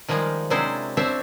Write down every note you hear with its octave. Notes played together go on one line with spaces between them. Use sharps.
D#3 F3 G3 G#3 A#3
C3 F#3 G#3 D4 E4 C5
C4 D4 C5 C#5 E5